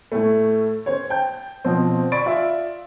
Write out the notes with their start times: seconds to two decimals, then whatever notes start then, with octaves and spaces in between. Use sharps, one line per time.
0.12 A2 A3
0.86 C#4 C5 C#5
1.10 G5 A5 G6
1.65 B2 F3 C4
2.12 D5 B5 C#6 A6 D7
2.26 F4 D5 E5